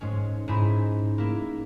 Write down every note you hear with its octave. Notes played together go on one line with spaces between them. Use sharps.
G#2 G#3 C#4
G#2 D#4 E4 B5
A#3 E4